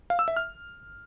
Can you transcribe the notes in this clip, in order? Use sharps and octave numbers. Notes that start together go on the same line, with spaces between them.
F5
E6
E5
F6